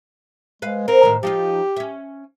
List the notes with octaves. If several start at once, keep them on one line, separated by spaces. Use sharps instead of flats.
G#3 B4 F5
C4 A#4
A2 D#3
F3 D#4 F4 G4
C#4 E5